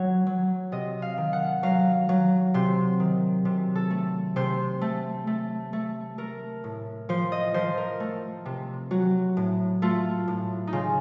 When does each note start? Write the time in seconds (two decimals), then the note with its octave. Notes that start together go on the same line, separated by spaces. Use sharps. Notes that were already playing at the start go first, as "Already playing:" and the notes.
Already playing: F#3 C#5
0.27 F#3
0.72 C3 D#5
1.02 F5
1.18 D#3
1.33 F#5
1.63 F#3 F5
2.09 F#3
2.54 C3 C5
3.00 D#3
3.45 C3
3.75 A4
3.90 A3
4.36 C3 C5
4.81 A3
5.27 A3
5.73 A3
6.18 A3 A#4
6.64 A2
7.09 F3 C5
7.32 D#5
7.54 F3 C5
7.78 A#4
8.00 A3
8.46 C3
8.91 F#3 F#4
9.37 A2
9.82 A3 F4
10.28 A2
10.67 D#4
10.73 C#3 F4